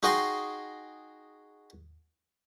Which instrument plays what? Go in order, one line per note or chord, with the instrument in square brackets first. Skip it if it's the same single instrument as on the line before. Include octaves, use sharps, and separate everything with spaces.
[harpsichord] D#4 F#4 G#4 D#5 G5 C6